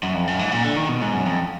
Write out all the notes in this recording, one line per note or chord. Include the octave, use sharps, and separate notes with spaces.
F#2
F2
F#2
G#2
A#2
D3
D#3
B2
G#2
F#2
F2